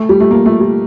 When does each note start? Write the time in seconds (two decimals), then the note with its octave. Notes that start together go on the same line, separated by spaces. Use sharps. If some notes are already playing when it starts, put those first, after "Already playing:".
Already playing: A3
0.09 G3
0.20 A3
0.31 A#3
0.46 A3
0.60 G3